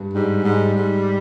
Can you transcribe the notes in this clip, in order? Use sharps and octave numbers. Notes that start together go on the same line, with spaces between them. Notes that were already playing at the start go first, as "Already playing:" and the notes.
Already playing: G2
G#2 G3
G#2
G#2